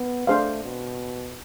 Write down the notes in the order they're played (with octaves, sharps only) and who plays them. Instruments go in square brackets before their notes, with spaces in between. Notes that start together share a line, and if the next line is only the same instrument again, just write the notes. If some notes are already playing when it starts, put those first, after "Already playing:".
Already playing: [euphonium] B3
[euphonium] A3 [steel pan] D4 G#4 C5 F5
[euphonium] B2